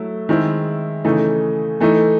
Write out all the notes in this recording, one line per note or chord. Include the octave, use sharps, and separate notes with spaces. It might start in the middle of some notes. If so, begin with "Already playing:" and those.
Already playing: F#3 A3 E4
D#3 G#3 C4 E4
C#3 E3 A3 D#4
E3 A3 D#4